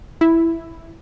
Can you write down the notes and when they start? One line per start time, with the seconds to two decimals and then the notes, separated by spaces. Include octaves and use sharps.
0.21 E4